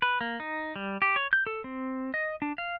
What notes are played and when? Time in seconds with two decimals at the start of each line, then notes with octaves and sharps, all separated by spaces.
0.02 B4
0.21 A#3
0.40 D#4
0.76 G3
1.02 G4
1.16 C#5
1.33 G6
1.47 A4
1.64 C4
2.14 D#5
2.42 D4
2.58 F5